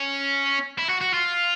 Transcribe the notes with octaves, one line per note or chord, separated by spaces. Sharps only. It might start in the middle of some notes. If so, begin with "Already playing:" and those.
Already playing: C#4
E4
F#4
F#4
F4